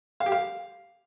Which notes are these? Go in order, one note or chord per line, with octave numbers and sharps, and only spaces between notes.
F5
G4
F5